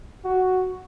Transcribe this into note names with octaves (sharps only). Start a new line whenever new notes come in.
F#4